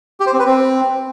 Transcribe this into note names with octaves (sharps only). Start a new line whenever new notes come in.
G4
C5
C4
B4
C4